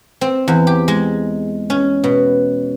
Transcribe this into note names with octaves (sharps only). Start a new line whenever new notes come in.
C4
E2
G4
G#3
C#4
B2